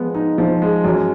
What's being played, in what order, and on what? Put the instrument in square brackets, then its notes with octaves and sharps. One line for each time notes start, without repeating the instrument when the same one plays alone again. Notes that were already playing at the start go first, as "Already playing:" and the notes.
Already playing: [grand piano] F3 G#3 B3
D#4
F3
G#3
F#2